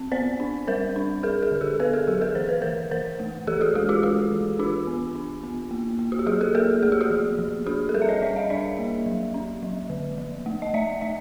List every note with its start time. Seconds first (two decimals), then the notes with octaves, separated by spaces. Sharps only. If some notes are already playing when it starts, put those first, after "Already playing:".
Already playing: C4
0.12 B3 C5 D5
0.40 D4
0.67 G3 A#4 C5
0.96 D4
1.23 D4 G#4 A#4
1.42 G#4 A#4
1.51 D3
1.61 G4 A4
1.80 B3 A4 B4
1.93 G#4 A#4
2.07 F#3 G4 A4
2.21 G#4 A#4
2.35 E3 C5
2.49 B4
2.62 E3 A#4 C5
2.91 E3 A#4 C5
3.20 A3
3.47 E3 G4 A4
3.61 F#4 G#4
3.75 G#3 F#4 G#4
3.89 F4 G4
4.03 G#3 F#4
4.31 E3
4.59 D4 F4 G4
4.87 B3
5.15 D4
5.43 B3
5.71 A#3
5.99 A#3
6.12 F#4
6.19 G4
6.26 F#3 F#4 G#4
6.41 G4 A4
6.55 A#3 G#4 A#4
6.82 A3 G#4
6.92 G4
7.01 F#4 G#4
7.10 F3
7.39 F3
7.67 D4 F#4 G#4
7.89 A4
7.94 G3 G#4 A#4
8.02 E5
8.09 C#5 D#5
8.22 G3 D5 E5
8.36 D#5 F5
8.50 D4 D5 E5
8.79 A#3
9.06 F#3
9.34 C#4
9.63 F#3
9.90 D3
10.18 F3
10.46 A3
10.62 D#5
10.74 A3 D5 E5
11.01 A3 D5 E5